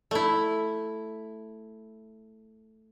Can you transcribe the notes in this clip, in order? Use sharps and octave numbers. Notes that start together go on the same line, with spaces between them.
A3 E4